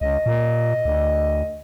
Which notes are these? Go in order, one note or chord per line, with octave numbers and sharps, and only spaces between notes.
C#2 D#5
A#2
D2